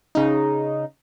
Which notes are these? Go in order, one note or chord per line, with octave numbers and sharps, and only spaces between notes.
C#3 D#4